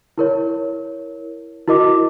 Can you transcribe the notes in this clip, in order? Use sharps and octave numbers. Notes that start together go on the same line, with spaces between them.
E4 A#4 C#5
E4 F#4 A#4 D#5 D6